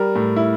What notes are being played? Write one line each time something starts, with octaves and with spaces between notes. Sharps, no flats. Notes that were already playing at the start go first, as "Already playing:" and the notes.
Already playing: G3 A#4
A2
E4